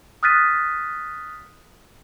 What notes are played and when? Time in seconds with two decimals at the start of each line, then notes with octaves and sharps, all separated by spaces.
0.23 D#6 F6 F#6 A6 B6 D#7